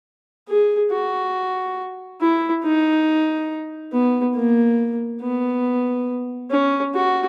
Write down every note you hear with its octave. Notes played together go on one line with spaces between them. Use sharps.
G#4
F#4
E4
D#4
B3
A#3
B3
C#4
F#4